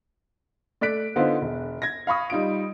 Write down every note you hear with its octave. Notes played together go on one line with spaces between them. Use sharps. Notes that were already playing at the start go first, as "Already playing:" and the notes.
A3 D5 F#6 B6 D7
D3 B3 D#4 F4 C5
E1
G#6 A#6
F5 B5 C#6 D#6
G3 D#4 F4 D7